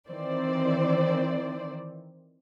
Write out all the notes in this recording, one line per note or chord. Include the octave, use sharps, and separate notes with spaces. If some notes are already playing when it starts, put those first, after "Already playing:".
D#3 E3 C4 C5 D5